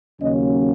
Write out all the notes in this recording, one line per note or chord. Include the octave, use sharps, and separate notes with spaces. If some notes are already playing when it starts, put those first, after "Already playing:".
D#2 C#3 F#3 A#3 C#4 D#5